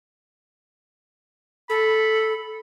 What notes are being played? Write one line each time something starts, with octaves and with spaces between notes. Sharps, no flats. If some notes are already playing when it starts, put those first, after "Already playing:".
A4 B5